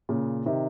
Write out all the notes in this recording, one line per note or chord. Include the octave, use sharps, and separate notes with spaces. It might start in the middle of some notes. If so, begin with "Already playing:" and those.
A#2 C#3
C3 D#3